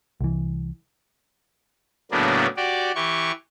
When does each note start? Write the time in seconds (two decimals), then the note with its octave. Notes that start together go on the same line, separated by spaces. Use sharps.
0.21 C2 E3
2.11 A2 C#3 F#3 A#3 B3 D4
2.57 F#4 G4 D5
2.95 E3 G4 C#6